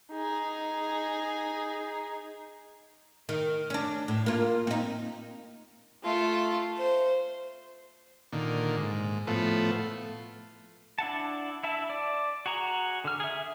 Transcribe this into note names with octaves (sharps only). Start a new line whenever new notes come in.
D#4 G#4
D#3
C#4 D4
A2
A#3 F4
C4 D#4
A3 F4
C5
A#2 D3 D#3
G#2
A2 F3 A3 B3
D4 E4 F#5 A5
E4 E5 A5
D5
F#4 G#4 A#5
D3 F6
G#4 E5